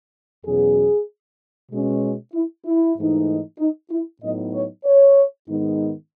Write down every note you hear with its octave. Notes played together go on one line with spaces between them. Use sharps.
E2 B2 F#3 C#4 G#4
B2 G#3 C#4
E4
E4
G#2 E3 A3 D#4
D#4
E4
A2 F#3 B3 D#4 D#5
C#5
C#5
G#2 D#3 G#3 B3 D#4